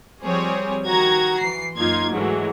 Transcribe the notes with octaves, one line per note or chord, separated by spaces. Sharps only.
F3 G3 C4 G#4 C#5
D#3 F#4 A#5 G#6
E3 C7
F#2 A#3 D#4 F4 C6 G#6
G#2 E3 F#3 G#3 A3